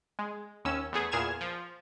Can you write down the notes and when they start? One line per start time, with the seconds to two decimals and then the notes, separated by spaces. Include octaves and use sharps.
0.19 G#3
0.65 D#2 C#4 E6
0.93 E2 A3 G#4
1.12 E2 A#2 G#4 F6 G#6 E7
1.41 F3